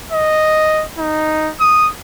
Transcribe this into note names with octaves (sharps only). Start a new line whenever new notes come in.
D#5
D#4
D#6